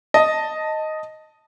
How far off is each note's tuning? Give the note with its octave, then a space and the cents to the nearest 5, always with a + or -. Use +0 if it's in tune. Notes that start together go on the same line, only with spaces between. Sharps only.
D#5 +0 A5 +10